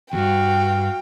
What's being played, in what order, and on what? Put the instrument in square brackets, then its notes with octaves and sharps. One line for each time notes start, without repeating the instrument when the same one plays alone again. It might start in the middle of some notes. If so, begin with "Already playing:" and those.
[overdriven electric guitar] E2 G2 [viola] F#4 F5 [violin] G5